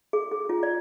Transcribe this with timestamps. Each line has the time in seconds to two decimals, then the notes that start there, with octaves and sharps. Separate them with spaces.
0.13 G#4
0.32 G#4
0.49 F4
0.63 D5